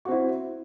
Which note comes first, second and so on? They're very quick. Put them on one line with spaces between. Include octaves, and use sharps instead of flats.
F#4 C4 E4